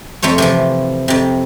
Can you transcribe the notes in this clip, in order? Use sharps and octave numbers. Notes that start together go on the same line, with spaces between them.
F2 A3 C5 C#5
C3 E3 F3
F2 C3